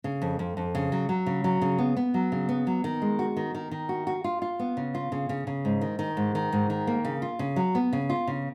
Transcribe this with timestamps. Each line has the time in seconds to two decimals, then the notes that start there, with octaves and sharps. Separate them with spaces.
0.04 C#3
0.22 F2
0.39 F2
0.57 F2
0.75 C#3
0.92 F#3
1.09 F#3
1.26 C#3
1.44 F#3
1.62 C#3
1.79 B3
1.97 B3
2.14 F#3
2.32 C#3
2.49 B3
2.67 F#3
2.84 D#3
3.02 G#3
3.19 F#4
3.37 D#3
3.55 D#3
3.71 D#3
3.89 F#4
4.07 F#4
4.24 F4
4.42 F4
4.59 B3
4.77 C#3
4.95 F4
5.12 C#3
5.29 C#3
5.47 C#3
5.65 G#2
5.81 D#3
5.99 D#3
6.17 G#2
6.35 D#3
6.52 G#2
6.70 D#3
6.87 A#3
7.05 C#3
7.22 F4
7.39 C#3
7.56 F#3
7.75 B3
7.93 C#3
8.10 F4
8.27 C#3